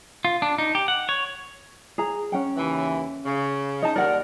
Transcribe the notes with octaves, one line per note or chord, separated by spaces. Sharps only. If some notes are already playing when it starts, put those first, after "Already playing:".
F4
D4
D#4
G4
F#5
C#5
G#4 A#5
C#4 F#5 G5
D#2 C#3 E3
C#3
D#4 D#5 A5
D#2 D#3 A#4 D5 F#5